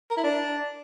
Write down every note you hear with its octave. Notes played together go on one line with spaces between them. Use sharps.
A#4
E4
D4